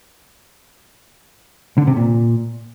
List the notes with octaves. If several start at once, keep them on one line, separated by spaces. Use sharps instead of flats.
D3
C3
A#2